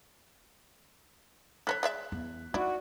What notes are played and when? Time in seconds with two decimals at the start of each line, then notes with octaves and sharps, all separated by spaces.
1.67 A4 A#4 C#5 F#6 B6
1.83 G#3 D5 E5
2.12 E2
2.54 D#4 E4 F#4 D5